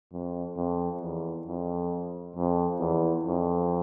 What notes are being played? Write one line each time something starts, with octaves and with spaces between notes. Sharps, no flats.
F2
F2
E2
F2
F2
E2
F2